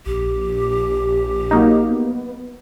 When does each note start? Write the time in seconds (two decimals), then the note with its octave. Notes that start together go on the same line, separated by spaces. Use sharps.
0.06 A#1 G4
1.51 F#3 A#3 D#4
1.89 B3